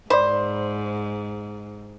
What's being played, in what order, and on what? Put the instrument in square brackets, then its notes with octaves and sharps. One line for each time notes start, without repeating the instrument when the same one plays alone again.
[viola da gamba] G#2 [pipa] C5 [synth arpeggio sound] D5 B5